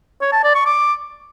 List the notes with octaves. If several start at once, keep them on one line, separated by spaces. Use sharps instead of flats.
C#5
A5
D5
C#6
D6